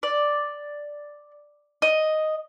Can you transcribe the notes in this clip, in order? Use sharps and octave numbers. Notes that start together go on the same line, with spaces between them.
D5
D#5